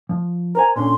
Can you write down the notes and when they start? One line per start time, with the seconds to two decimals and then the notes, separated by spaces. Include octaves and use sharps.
0.09 F3
0.55 A#4 C5 G#5 A#5
0.76 A#2 D3 C#4 C6